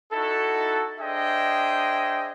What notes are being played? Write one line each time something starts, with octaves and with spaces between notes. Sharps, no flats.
D#4 E4 F#4 A4
D4 G#4 C5 D#5 E5 G5